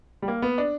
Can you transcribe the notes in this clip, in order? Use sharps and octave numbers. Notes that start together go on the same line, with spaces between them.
G3
A#3
B3
D4